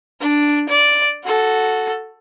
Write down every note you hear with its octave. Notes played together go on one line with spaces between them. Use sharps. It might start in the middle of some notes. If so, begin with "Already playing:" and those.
D4
D5
F#4 A4